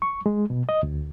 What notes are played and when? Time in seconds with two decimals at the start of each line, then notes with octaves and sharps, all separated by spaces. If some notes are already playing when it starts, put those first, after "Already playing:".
0.02 C#6
0.26 G#3
0.50 B2
0.69 D#5
0.83 D2